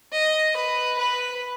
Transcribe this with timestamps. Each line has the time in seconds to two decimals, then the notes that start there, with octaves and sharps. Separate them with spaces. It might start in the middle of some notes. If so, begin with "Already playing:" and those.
0.13 D#5
0.57 B4
0.99 B4